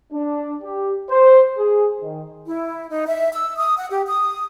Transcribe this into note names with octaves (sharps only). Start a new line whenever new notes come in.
D4
G4
C5
G#4
D#3
E4
D#4
E5
E6
D#6
F#5
G4
D#6